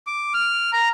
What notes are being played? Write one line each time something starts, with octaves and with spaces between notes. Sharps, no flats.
D6
F6
A#5